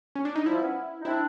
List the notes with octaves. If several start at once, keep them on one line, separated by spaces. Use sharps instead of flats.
C#4
D4
D#4
F3 G3 E4
B3 C#4
D#4
C4 D4 E4